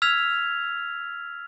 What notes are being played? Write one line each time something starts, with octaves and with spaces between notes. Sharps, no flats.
E6 F6 G#6 B6 F7